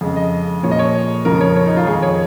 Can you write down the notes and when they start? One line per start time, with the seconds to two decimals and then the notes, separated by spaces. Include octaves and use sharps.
0.01 F2 C#3 G#3
0.16 D#5
0.63 A#2 F3 G#3 C#5
0.71 D#5
0.79 C#5
1.25 F2 C#3 F3 G#3 A#4
1.41 C#5
1.56 C#5
1.66 D#4
1.77 F4
1.86 F2 D#3 G#3 G#4
2.02 C#5